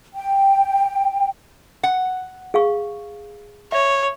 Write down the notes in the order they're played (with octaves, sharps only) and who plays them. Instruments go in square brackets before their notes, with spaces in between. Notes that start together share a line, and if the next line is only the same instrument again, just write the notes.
[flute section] G5
[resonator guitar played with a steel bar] F#5
[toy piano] G#4 F5 C#6
[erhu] C#5 [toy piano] E5